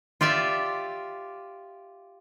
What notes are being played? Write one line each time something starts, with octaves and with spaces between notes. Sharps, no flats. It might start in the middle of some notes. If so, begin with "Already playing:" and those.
F4 G4 D5 E5